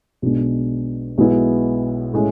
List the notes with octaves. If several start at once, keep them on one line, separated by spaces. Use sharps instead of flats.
B1 B2 G#3 D4
B1 B2 G#3 B3 E4
A2 G#3 C#4